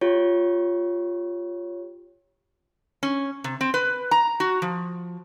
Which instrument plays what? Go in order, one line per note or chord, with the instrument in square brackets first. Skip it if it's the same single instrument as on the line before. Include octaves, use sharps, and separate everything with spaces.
[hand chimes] F4 G4 C#5
[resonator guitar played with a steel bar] C#4
C3
C4
B4
A#5
F#4
F3